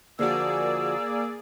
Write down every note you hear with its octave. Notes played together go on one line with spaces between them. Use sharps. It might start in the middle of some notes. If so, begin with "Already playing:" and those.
D3 F3 A#3 F#4 G#4 D5 E6